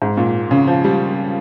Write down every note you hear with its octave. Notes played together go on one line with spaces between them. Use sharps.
G#2
A#2
C#3
F3
G3